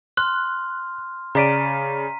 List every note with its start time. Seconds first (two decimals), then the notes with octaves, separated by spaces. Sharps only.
0.17 C6 F6 F#6
1.35 C#3 D5 A#5 B6 D7 D#7